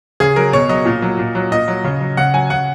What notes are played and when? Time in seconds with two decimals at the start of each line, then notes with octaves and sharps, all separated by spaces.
0.20 C#3 G#4
0.36 F#3 A#4
0.53 B2 C#5
0.69 F#3 D#5
0.86 A#2
1.02 F#3
1.19 A#2
1.35 F#3
1.52 A#2 D#5
1.68 F#3
1.84 C#3
2.01 F#3
2.17 C#3 F#5
2.34 F#3 G#5
2.50 C#3 F#5